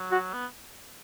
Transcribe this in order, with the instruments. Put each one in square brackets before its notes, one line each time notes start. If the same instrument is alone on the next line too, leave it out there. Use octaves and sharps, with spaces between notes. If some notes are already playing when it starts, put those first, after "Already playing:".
Already playing: [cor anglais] F#3
[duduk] F#4
[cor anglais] B3